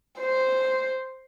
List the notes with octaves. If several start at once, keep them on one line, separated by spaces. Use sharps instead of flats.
C5